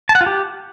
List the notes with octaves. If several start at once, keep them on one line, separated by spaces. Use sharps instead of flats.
A5
F#5
F4
G4